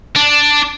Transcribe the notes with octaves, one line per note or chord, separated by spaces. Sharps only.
D4